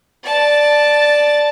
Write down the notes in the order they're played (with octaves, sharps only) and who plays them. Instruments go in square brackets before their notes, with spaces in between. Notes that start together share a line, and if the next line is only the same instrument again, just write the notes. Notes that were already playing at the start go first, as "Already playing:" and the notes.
[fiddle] D5 A5